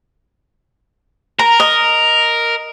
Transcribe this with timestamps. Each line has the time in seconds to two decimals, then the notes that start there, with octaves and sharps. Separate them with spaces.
1.39 A#4 A#5
1.60 D#5